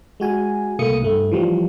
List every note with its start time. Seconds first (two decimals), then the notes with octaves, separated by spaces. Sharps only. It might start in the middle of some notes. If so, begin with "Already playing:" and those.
0.20 G#3 F#4 G#5
0.79 C2 A3 A#3 D#6 C#7
1.02 G2 A3
1.31 E3 F3 G3